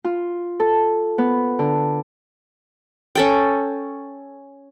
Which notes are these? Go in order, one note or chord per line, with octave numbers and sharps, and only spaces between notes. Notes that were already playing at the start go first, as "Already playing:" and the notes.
F4
A4
B3
D3
C#4 A4 G5